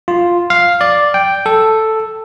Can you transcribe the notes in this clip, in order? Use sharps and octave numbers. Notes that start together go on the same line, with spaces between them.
F4
F5
D5
G5
A4